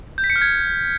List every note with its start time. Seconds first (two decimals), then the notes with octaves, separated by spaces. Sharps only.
0.18 G6
0.24 B6
0.30 C#7
0.36 F6
0.42 G#6